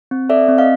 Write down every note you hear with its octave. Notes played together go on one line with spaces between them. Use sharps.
C4
A4 D5 E5
C4
D#5 F5